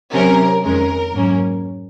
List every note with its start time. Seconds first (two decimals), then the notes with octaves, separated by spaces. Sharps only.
0.13 C3 F#3 C#4 A#4
0.63 F2 D#3 G#3 C#4 A#4
1.14 G#2 F#3 A#3 C#4